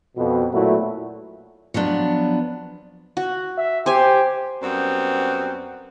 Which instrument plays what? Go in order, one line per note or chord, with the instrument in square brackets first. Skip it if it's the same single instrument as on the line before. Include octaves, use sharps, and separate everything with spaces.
[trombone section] F2 B2
A#2 F#3 A3 B3 E4 F#4
[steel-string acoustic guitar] F3 F#3 B3 D4
[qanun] F#4
[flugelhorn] E5
[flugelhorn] G4 [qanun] C5 G#5
[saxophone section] F#2 G3 B3 C4